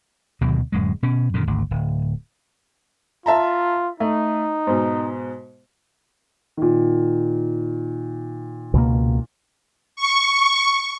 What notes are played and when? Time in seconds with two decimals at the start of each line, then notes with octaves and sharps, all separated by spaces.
0.41 D2 B2 D#3 F#3
0.72 D1 F#2 G#3
1.03 B2 C#4
1.34 F#2 A#2 D3 D#3
1.47 G#1 D2
1.71 D1
3.26 F4 E5 A5 A#5
4.00 A3 D#4
4.67 G#2 B2
6.57 A#2 D#3
8.74 C#2 B2 A#3
9.96 C#6